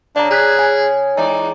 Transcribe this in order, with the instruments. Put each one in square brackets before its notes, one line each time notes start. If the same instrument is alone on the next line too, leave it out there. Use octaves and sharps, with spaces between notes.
[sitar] C#3 [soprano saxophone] D4 [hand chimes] D5 A#5
[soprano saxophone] G#4 [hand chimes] A#5 F#6 B6
[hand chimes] G#5
[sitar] E2 G#3 D5 [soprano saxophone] D#4